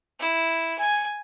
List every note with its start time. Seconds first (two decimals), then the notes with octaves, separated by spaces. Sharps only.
0.19 E4
0.78 G#5